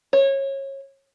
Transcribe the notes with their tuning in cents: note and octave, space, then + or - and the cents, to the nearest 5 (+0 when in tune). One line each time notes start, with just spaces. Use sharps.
C#5 -25